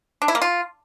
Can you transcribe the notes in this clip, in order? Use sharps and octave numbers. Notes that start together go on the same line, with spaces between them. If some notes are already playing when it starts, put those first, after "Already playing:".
D4
E4
A#3
F4